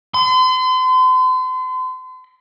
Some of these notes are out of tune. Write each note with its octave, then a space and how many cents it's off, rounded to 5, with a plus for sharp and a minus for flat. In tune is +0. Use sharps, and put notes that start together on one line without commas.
C6 -40